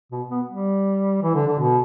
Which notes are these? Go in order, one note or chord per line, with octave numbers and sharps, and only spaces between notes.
B2
B3
G3
E3
D3
D3
B2